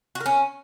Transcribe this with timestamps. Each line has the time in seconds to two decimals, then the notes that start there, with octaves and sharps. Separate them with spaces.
0.15 F#4
0.20 A#4
0.26 C#4